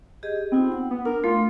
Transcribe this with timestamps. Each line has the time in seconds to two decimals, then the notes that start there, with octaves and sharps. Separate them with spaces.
0.23 G4 G#4 D#5
0.52 B3 C4 D#4 F4
0.72 F#5
0.91 B3
1.05 D4 A#4
1.24 A3 F4